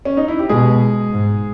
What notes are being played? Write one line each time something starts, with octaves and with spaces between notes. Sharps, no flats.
C#4
D#4
E4
G4
B2 G#3 G#4
G#2